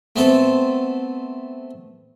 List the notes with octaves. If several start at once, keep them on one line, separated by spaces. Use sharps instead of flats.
A3 B3 C4 A4